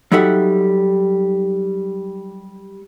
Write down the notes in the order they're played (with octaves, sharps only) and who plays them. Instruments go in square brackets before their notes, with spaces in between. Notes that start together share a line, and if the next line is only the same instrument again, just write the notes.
[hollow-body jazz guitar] F#3 G3 D#4 A4 E5 F#5